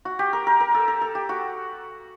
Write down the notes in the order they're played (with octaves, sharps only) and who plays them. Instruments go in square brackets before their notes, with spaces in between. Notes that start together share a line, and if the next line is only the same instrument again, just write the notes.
[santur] F#4
G4
A#4
A#4
A#4
A4
A#4
A4
G4
F#4